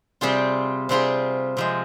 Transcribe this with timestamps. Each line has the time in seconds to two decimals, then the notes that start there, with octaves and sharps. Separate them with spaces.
0.21 C3 G3 C4 F4 G#4
0.89 C3 G3 C4 F4 G#4
1.57 C3 F3 G#3